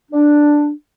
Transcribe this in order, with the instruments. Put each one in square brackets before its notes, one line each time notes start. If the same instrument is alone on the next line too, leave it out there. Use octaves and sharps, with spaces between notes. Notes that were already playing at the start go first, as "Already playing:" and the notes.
[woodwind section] D4